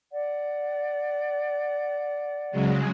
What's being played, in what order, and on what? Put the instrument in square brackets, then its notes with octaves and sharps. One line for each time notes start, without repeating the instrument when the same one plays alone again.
[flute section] D5 F#5
[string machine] C#3 F#3 G#3